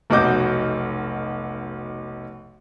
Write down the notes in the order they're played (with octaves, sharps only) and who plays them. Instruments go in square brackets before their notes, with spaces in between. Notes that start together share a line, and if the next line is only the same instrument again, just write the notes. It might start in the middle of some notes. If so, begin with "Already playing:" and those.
[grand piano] F1 B1 F#4 D#5 D6 G6